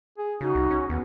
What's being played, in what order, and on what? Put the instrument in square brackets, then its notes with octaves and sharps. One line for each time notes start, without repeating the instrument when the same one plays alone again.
[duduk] G#4
[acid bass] C#3 [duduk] D#4 [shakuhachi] F#4
[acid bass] C2
C#4
[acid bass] D#2 [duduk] B3